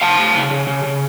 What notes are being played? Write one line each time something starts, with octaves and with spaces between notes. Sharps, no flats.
C#3 F5 A5
A3
C#3
C#3
C#3
C#3